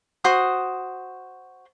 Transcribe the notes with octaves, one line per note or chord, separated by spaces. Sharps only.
F#4 C5 D#6